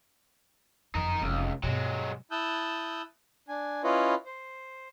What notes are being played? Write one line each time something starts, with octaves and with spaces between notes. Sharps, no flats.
F#1 F2 D#4 A#4
F1 C#2
G2 B2 F#3 G#3
E4 A5 D#6 E6 F#6 G6
D4 G#5
C#4 E4 F4 B4 C#5 D#5
C5